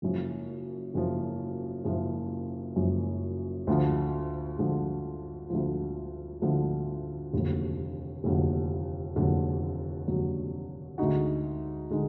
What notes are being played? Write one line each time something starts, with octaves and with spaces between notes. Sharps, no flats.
F#1 F#2 F3
F#1 F#2 F3
F#1 F#2 F3
F#1 F#2 F3
D2 D3 F3
D2 D3 F3
D2 D3 F3
D2 D3 F3
F1 D#2 D3 F#3
F1 D#2 D3 F#3
F1 D#2 D3 F#3
F1 D#2 D3 F#3
D2 D3 G#3 D#4 F#4
D3 G#3 D#4